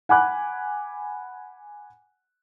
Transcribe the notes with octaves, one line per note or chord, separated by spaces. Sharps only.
F#5 G#5 B5 D6 F#6